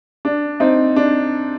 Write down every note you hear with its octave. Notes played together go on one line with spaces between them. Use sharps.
D4
C4 D#4
D4